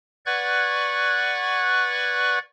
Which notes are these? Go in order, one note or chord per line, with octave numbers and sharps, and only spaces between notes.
B4 D5 F#5 C#6 F#6 G#6